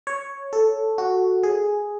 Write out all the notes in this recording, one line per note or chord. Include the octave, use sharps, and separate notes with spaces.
C#5
A4
F#4
G#4